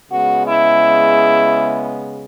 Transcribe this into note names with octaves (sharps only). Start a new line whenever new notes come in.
C#3 G#3 B3 F#4
E4